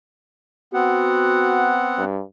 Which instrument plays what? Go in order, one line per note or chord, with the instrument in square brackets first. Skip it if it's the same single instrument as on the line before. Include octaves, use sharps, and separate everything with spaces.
[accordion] B3 C4 F#5 [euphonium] F#4
[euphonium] G2